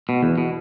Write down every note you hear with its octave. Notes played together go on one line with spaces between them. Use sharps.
B2
E2
B2